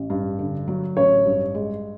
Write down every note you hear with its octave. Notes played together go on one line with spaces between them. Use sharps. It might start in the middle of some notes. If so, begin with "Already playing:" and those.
Already playing: A1
G2
D3
F#3
A1 C#5
G2
G#3